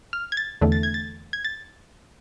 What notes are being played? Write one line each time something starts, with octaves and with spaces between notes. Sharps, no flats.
F6
G#6
A6
E2 D3 A3
A6
G#6
A6
G#6
A6